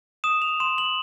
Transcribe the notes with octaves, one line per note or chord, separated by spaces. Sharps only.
D#6 E7
F7
C6 E7
F#7